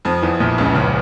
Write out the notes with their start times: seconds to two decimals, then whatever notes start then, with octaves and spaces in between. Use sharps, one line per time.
0.05 F2 F3
0.22 E2 E3
0.40 A#1 A#2
0.58 C#2 C#3
0.74 C#2 C#3